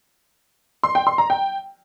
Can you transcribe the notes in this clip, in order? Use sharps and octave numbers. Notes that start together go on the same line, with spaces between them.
C6
G5
C6
A#5
G5